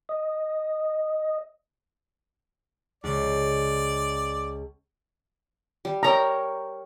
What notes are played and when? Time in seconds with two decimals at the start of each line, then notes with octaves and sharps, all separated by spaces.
0.09 D#5
3.04 C#2 D5
5.85 G3
6.03 A#4 C#5 G5 A#5